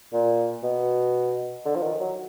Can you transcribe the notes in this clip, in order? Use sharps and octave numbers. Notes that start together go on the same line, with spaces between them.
A#2
B2
D3
F3
D#3
F#3